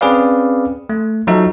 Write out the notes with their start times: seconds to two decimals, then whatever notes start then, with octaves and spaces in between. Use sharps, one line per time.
0.01 C4 C#4 G#4 B4 D5 F5
0.89 A3
1.27 F3 F#3 D#4 F#4 A4 E5